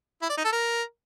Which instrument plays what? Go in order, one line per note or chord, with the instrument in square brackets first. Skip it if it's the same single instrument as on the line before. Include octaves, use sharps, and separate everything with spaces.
[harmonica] E4
D5
D#4
A4
A#4